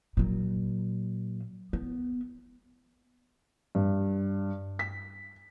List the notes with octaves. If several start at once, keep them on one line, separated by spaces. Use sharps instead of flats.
A#2 F#3
B3
G2
B6